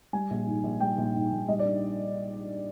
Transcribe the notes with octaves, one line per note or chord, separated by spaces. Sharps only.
G3 G#5
A#1
G#2
A#1
G3 G5
A#1
G#2
A#1
G3 D#5
D5
D4